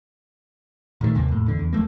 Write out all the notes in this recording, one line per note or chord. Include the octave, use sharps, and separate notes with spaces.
A#2 D#3 F#3 A3
G1 D#2 C3 A#3
F2 A2
E2 D3
E2
E1 F3 A3 A#3